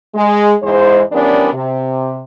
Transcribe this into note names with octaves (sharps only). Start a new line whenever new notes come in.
G#3
E2 G#2 E3 G#3 C5
E3 G3 B3 C#4 D4 A#4
C3